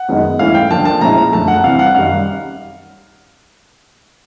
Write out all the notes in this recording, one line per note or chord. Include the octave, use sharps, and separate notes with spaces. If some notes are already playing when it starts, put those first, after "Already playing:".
Already playing: F#5
F#2 D#3 G#3 B3 D#4
G#2 E3 A3 C#4 E4 F5
G5
D3 F3 A#3 D4 A5
A5
A#2 F3 G#3 C#4 E4 A#5
A#5
F#2 D3 F3 A3 A5
F#5
C3 E3 G3 C4 F5
F#5
F#2 D#3 G3 F5